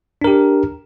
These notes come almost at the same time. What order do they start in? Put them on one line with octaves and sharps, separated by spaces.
D4 A#4 G4